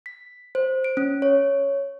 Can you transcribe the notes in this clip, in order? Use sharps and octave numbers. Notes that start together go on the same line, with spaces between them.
B6
C5
D7
C#4
C#5